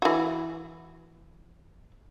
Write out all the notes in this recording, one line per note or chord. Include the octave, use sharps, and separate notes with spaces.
E3 F#4